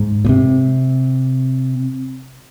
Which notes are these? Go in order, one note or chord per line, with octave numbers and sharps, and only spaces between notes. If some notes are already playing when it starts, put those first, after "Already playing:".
Already playing: G#2
A#2
C3